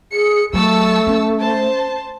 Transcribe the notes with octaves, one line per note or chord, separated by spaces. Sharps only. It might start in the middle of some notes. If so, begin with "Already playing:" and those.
G#4 C#7
F#3 A3 A5 C#6 E6
C#4
C5 A5